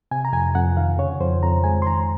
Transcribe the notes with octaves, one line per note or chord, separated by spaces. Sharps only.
C3 G#5
A#5
F2 G#5
F2 F#5
D#3 F5
C#3 C#5
F2 C5
F2 A#5
G#3 G#5
C6
D#3 A#5